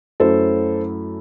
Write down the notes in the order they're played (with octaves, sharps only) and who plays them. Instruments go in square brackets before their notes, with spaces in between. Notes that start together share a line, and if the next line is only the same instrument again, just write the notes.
[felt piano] F#2 F#3 A3 E4 A4 C5